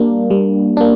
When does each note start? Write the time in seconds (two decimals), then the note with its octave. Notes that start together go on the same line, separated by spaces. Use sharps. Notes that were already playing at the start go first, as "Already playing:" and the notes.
Already playing: G3 A#3 D4
0.30 G3
0.77 A#3 D4